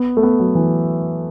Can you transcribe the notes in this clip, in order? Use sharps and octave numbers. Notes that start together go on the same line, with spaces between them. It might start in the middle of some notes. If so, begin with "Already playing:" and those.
Already playing: B3
A3
B3
F#3
E3